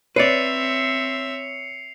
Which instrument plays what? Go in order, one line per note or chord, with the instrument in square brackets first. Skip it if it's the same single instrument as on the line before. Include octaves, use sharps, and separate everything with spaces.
[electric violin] C4 E5 [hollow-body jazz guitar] B4 D5 [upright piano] C#5 [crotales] C7 C#7 F7